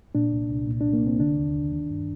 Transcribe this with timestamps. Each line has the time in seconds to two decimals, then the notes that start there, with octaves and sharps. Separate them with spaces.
0.15 A#2 D4
0.32 C2
0.50 C2
0.67 A#2
0.81 C2 D4
0.93 A#3
1.02 C2 C4
1.20 D3 D4
1.37 D#2
1.54 D#2
1.72 D#3
1.90 G2